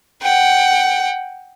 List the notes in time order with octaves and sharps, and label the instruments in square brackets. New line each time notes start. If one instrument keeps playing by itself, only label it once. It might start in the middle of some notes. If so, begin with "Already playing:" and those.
[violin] F#5 G5